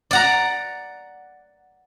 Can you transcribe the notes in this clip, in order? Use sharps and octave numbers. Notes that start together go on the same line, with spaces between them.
D5 F#5 A#5